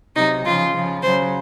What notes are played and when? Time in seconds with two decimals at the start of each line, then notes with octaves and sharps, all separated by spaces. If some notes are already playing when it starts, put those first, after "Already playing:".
0.16 C3 F#3 D#4
0.45 C#3 F3 F4
0.74 C#3 F3
1.03 C#3 F#3 C5